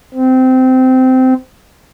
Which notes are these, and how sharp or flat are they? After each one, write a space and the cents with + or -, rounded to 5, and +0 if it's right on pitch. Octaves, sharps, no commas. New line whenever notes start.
C4 -20